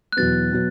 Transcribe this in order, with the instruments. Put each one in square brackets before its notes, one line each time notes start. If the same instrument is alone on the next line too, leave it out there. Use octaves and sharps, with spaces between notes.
[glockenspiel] F#6
[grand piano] E2 B2 F#3 B3 [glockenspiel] A6
[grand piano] B2 F#3 B3